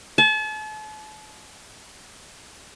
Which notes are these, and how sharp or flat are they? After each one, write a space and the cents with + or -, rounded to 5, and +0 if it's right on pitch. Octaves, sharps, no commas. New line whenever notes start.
A5 -40